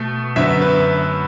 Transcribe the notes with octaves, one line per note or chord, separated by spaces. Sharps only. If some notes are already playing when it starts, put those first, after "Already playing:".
Already playing: B2 A3
F#2 D3 B3 E5
B4